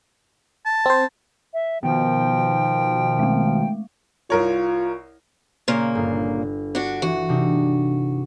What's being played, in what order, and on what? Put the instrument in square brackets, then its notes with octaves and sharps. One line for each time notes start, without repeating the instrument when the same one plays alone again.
[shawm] A5
[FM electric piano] C4 C5
[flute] E5
[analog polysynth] B2 D#3 [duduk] F3 [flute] G5
[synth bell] G#3 A3
[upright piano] C2 A#4 C#5 [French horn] F4
[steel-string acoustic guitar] A#2 C#3 A#3
[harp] G1
[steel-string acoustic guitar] D4 F#4
[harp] E3 [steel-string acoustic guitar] F#4
[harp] C3 D4 D#4